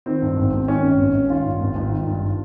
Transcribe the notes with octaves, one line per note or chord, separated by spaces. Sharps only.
D#3 C4
G2
G#1
G#1
D#3 C#4
G2
G#1
G#1
D#3 F4
G2
G#1
G#1
D#3
G2